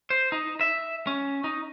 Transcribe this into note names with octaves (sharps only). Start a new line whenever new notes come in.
C5
D#4
E5
C#4
D#4